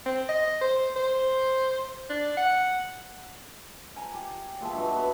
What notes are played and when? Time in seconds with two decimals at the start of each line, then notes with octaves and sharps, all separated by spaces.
0.06 C4
0.29 D#5
0.61 C5
0.96 C5
2.10 D4
2.37 F#5
3.96 G#5 A#5
4.14 G4
4.61 A#2 G#3 E5 A5
4.73 G2 F#3
4.96 B3